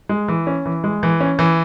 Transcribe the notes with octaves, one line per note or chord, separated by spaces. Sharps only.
G#3
E3
C#4
E3
G#3
E3
C#4
E3